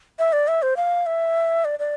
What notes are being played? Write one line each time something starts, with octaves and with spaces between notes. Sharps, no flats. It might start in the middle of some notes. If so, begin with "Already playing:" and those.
E5
D5
E5
C5
F5
E5
D5
D5